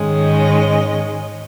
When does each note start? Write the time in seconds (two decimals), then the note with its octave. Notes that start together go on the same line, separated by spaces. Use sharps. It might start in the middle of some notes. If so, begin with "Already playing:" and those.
Already playing: G#2 D#3 G#3 C#4
0.21 D#5